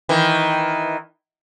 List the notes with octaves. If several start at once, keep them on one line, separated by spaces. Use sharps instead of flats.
D#3 E3